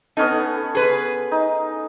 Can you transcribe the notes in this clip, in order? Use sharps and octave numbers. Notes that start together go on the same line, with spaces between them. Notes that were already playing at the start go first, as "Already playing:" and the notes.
B3 C#4 D#4 A4
A4
G#4 B4
D#4